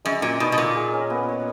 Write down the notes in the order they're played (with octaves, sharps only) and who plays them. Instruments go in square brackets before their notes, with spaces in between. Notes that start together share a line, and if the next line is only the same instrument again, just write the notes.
[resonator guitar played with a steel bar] F#2 [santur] G#3
[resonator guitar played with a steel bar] A#2 [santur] F#4
[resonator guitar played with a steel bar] B2 [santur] D#4
[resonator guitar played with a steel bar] B2
[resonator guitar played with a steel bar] A#2 [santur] A#3
[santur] G#4
C#4
B3
C#5